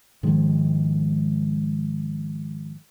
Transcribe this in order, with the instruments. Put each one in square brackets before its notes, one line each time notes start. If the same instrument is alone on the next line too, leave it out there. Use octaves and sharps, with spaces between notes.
[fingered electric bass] G#2 D#3 F3 G#3